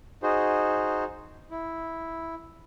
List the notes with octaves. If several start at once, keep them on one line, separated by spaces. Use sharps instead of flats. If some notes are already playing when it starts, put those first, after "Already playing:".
D#4 F#4 G#4 C5
E4